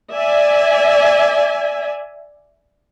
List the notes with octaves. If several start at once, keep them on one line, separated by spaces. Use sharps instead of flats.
D5 E5 G#5